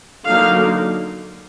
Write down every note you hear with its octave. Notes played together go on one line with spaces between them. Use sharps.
D3 F#3 A#3 D#4 F5